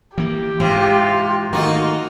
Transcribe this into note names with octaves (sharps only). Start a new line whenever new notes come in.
E3 A#3 G4
G#2 C3 E3 F4
D#3 A3 A#3 D#4 F4 F#4